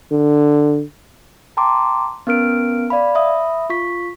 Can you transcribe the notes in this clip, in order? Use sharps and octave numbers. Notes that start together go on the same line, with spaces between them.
D3
G5 A5 A#5 C6 D6
B3 C#4 A#4 F6 D7
D5 F5 B5
E5 B5 D#6
F4 C#6 B6